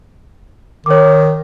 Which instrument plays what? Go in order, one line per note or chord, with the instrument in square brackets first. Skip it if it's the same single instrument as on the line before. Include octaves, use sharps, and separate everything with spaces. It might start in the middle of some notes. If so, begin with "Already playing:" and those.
[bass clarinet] D#3 [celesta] C#5 D6